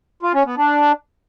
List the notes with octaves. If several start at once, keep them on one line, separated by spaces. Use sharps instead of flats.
F4
C#4
B3
D4